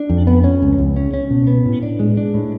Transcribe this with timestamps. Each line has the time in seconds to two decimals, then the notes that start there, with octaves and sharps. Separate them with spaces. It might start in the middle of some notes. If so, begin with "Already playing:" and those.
Already playing: D4
0.10 F2
0.27 B3
0.44 C#4
0.62 C#2
0.78 C#2
0.97 C#4
1.14 C#4
1.30 B2
1.47 B3
1.66 A2
1.83 D4
1.99 G#3
2.17 D4
2.34 A2